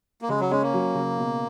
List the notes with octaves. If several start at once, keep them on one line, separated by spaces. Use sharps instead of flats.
A#3
C#3 G#3
F#3
G#3 C#4
A#3
F#3
C#3
B2